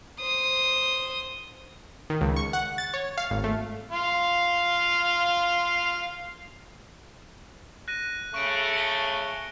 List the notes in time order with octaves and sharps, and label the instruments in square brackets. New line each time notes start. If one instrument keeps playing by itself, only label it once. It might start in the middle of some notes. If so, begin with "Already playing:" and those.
[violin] C5 D#6
[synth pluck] D#3
C#2
C#6
F#5
A6
C#5
F5
G#1
A3
[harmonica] F4 F5
[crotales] F#6 A#6 D#7
[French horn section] C#3 A3 [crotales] C#6 D7
[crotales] C#7 F#7 G7